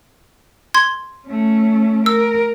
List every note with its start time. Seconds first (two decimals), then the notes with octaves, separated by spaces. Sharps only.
0.74 C6 G#6
1.27 A3 C#4
2.06 A#4 E6